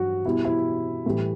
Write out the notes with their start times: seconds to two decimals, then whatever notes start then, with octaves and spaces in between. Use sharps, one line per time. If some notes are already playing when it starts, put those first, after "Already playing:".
Already playing: G2 F#3 F#4
0.25 B2 G3 E4
0.45 E4
1.06 A2 E3 G3